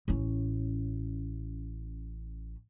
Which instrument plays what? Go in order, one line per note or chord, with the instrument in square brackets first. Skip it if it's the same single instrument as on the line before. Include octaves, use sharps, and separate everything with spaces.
[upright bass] A1 C#4